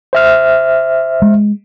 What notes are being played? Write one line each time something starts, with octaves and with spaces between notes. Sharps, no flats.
C5 E5 F6
G#3